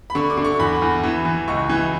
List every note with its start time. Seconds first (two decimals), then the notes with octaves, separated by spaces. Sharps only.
0.10 B5
0.15 D3 C#6
0.30 D6
0.37 D3
0.44 C#6
0.59 E2 B5
0.82 E2
1.04 E3
1.25 E3
1.48 C#2 C#6
1.69 E3